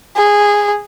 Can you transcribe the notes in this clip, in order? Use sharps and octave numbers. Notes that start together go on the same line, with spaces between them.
G#4